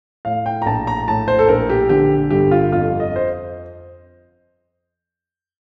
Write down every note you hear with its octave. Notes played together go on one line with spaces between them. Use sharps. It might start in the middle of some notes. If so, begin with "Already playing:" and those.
A2 F5
G5
A#5
A#1 A5
A#5
A2 A5
C5
A4
A#1 A#4
G4
D3 G4
G1 G4
F4
F2 F4
D#5
C5